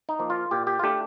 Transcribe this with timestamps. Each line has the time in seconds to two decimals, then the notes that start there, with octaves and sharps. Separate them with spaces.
0.09 D#4
0.19 F3 A#3
0.30 F4
0.51 A#2 G4
0.67 G4
0.79 F4
0.83 A3 D4 G4